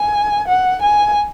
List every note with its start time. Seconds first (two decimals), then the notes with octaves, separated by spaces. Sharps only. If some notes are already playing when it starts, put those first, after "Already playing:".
Already playing: G#5
0.48 F#5
0.82 G#5